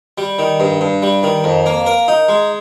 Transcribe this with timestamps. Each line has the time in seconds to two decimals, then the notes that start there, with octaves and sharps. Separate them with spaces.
0.18 G3
0.39 D#3
0.60 G2
0.81 G2
1.02 G3
1.23 D#3
1.44 F2
1.66 A#3
1.86 A#4
2.08 D#4
2.28 G#3